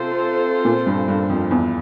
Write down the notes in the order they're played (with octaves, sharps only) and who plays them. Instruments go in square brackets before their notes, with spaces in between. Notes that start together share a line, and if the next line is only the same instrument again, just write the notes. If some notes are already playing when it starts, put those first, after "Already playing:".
Already playing: [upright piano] C3 [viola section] C4 F4 A4 C5
[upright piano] A#2
G2
G2
F2
E2